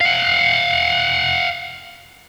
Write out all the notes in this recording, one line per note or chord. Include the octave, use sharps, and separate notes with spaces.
F5 F#5